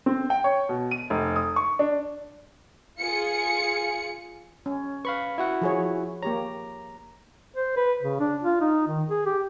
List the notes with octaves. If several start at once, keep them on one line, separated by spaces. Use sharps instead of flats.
C4
G5
C#5
B2
D#7
F1
D#6
C#6
D4
F4 G#4 C#7
C#4
B4 F5 B5 C#6
E4 F#4 F#5
F3 G#4 C#5
A#3 G4 C#5 A#5
C5
B4
C#3
D4
F4
D#4
D#3
G#4
G4